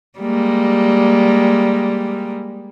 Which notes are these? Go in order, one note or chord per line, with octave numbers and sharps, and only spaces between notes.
G3 G#3 A#3